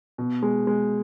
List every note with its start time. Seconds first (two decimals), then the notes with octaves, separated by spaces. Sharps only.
0.18 B2
0.43 G#3
0.67 G#3